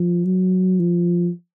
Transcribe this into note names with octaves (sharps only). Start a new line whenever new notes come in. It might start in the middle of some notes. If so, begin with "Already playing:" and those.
Already playing: F3
F#3
F3